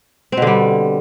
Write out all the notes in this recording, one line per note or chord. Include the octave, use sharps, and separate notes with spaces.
B2 D3 G3 C4